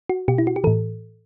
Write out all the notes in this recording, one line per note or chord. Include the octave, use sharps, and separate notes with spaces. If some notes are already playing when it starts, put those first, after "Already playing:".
F#4
B2 G4
E4
F#4
G4
A2 E3 A4